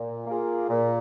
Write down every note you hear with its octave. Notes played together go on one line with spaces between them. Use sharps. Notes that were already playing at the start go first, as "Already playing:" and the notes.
Already playing: A#2
A#3 F4 G#4
A#2